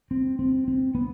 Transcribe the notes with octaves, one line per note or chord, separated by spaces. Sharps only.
C4
C4
C4
B3